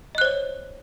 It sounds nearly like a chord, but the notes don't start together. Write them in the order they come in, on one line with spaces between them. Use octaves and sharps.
D#5 F#6 C5 C#5